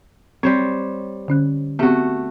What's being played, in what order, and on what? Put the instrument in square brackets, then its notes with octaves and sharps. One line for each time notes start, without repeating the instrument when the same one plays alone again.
[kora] G3 C5 C#5 [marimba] C4
[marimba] D3 C#4 F#6
[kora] A3 F#4 [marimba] B3 C4 G4